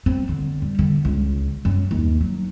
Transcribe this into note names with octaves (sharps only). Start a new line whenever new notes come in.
C4
D3
G3
D3
C#2
F#2
D#2
F#3